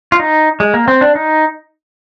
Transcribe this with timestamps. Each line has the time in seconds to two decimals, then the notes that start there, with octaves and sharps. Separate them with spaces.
0.12 F4
0.20 D#4
0.60 G#3
0.74 A#3
0.88 C4
1.01 D4
1.15 D#4